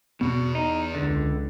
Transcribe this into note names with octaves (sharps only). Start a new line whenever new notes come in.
E2 B2 B3
D#4
C#2 D3